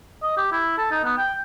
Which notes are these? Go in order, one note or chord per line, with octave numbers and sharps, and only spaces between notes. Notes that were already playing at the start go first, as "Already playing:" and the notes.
D#5
G4
E4
A4
D#4
B3
G5